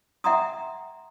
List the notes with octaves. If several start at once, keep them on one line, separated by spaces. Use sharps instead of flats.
E5 F#5 G5 A#5 C6 D#6